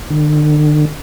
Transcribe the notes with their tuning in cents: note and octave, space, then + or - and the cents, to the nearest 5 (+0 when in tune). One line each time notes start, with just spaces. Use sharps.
D3 +40